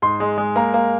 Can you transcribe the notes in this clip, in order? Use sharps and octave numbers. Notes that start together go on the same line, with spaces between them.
G#2 C6
G#3
G#3
A#3 A#5
A#3